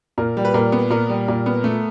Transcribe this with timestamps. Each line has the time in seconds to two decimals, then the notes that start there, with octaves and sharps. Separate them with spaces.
0.18 A#2 A#4
0.37 G3
0.45 B4
0.54 A#2 A#4
0.72 B3
0.91 A#2 A#4
1.09 G3
1.28 A#2
1.46 B3
1.64 A3